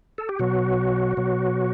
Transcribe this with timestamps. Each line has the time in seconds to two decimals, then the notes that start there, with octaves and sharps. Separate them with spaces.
0.18 A4
0.29 G4
0.39 B2 F#3 F#4
1.17 B2 F#3